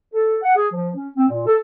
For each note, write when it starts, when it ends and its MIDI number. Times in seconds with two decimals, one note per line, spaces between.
0.14 0.36 69
0.42 0.55 78
0.55 0.67 68
0.72 0.90 53
0.96 1.10 61
1.16 1.26 60
1.29 1.45 46
1.47 1.57 69